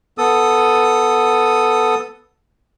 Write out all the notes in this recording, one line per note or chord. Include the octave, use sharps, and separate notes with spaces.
B3 A4 D#6